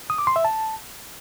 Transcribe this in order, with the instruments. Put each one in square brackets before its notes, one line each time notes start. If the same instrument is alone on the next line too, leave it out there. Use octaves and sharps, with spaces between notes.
[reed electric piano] D#6
D6
C6
E5
A5